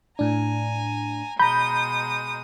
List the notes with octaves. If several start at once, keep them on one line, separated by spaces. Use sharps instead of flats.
A2 D4 G#5 A#5
B2 G#3 A#5 B5 D#6 G6